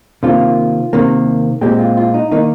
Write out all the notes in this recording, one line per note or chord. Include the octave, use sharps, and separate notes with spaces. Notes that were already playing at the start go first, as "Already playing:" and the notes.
C3 D#3 A#3 F4
C3 D#3 A#3
A#2 G#3 C4 G4
F4
F4
D#4
D#3 A#3 D#4